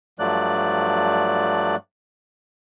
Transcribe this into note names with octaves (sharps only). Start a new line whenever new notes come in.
G2 F3 F#3 A3 D5 F#6